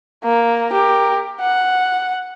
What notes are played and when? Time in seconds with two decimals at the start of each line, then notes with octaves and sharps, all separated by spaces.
0.24 A#3
0.70 G4 A#4
1.41 F#5